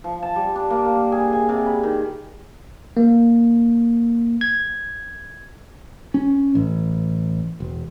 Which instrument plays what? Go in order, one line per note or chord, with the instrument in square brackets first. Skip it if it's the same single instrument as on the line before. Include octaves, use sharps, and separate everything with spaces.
[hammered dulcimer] F3
A5
G3
D4
A#3
A#4
G#4
G#5
C3
B5
D#3
[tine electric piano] A#3
G#6
[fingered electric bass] C#4
A1
E1